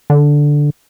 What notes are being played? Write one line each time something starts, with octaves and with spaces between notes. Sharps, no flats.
D3